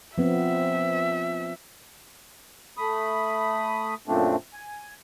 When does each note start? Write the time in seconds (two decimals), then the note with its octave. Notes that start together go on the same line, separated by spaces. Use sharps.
0.18 F3 B3 C4 E5
2.77 A3 B5 D#6
4.08 F#2 A#2 F3 A3 C4 D4
4.53 G#5